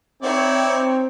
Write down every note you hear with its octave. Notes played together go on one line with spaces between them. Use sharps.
C4 D#4 E4 C#5 D5